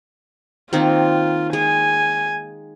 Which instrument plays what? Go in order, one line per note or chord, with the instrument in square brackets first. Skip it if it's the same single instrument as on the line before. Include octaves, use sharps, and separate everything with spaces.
[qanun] D#3 A#3 C4 [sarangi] F4
[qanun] G#3 [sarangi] G#5